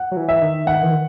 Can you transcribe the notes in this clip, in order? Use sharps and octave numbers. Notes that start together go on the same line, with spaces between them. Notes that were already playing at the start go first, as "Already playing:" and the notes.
Already playing: F#5
F#3
E3
E5
D#3
D#3 F#5
E3
D#3